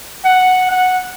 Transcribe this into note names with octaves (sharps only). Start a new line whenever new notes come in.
F#5
F#5